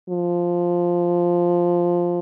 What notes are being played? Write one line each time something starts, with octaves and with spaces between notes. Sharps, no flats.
F3